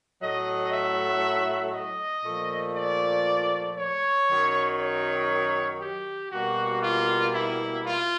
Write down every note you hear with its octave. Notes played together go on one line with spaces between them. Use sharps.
A2 F#3 A3 D#5
E5
D#5
A#2 F3 A3
D5
C#5
F#2 D#3 F#3
C#5
G4
B2 G3 A#3 F#4
F4
E4
F4